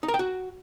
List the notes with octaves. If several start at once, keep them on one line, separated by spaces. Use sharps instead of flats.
D#4
A#4
G5
F#4